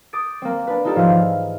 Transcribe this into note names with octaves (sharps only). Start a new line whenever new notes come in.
D6 D#6 G6 A6 D7
A#3 C4
D4 B4
A3 D#4 F4 G4 A4
G#2 F3 F4 C5 F5 D#7
E3